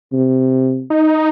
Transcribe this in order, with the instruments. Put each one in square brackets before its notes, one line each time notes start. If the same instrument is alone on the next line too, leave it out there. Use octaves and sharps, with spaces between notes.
[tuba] C3
[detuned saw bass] D#4